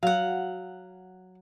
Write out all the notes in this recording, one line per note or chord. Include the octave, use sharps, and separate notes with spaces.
F#3 F5 F#5